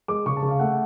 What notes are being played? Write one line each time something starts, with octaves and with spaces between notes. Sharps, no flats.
G#3 D6
C#3 C#6
A5
C#3
F5
A3 F#5